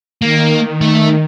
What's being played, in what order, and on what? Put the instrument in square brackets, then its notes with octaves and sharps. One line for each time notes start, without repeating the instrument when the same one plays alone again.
[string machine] D#3 [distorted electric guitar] A#3
[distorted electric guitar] A3 E5